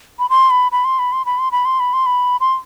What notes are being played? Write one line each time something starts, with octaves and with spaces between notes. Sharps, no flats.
B5
C6
B5
B5
C6
B5
C6
B5
C6
B5
C6
B5
C6
B5
C6